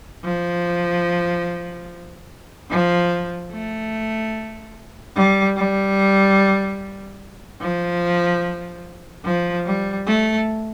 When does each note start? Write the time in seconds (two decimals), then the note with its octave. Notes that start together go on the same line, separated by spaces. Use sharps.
0.24 F3
2.70 F3
3.52 A3
5.16 G3
5.56 G3
7.61 F3
9.25 F3
9.65 G3
10.07 A3